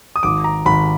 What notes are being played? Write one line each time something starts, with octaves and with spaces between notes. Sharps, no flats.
D#6
G#1 D6
A#5
G#1 B5